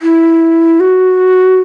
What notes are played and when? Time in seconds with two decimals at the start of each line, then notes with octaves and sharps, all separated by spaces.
0.02 E4
0.80 F#4